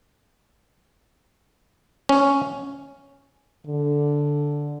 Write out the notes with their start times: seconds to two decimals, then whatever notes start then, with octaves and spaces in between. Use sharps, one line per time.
2.09 C#4
3.67 D3